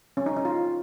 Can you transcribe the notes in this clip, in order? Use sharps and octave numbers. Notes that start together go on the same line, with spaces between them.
C#4
D#4
D#4
F4